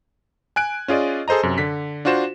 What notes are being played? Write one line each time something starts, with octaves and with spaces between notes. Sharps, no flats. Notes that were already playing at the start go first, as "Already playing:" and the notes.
G#5 F#6 D7
C#4 F4 G#4 D5 D#5
G#4 A4 C5 D#5 A#5
F#2 C3
D3 B6
D4 F4 F#4 C5 E7